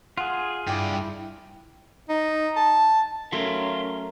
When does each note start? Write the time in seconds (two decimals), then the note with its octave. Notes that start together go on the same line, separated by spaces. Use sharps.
0.17 F4 G#4 F#5
0.67 G2 E4 D5 G5
2.09 D#4
2.56 A5
3.32 F#3 A3 C#4 A#4 E5 F5 C6